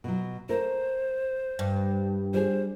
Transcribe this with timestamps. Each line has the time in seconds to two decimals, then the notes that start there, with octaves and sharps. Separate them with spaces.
0.04 B2 F#3
0.49 A3 A#4 C5
1.59 G2
2.34 G3 G#4 C5